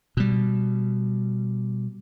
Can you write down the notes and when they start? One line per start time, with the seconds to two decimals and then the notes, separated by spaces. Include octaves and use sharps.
0.17 B2 G3